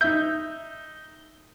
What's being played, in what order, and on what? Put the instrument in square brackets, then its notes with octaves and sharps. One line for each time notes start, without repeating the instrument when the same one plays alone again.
[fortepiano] D#4 E5 [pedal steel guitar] G6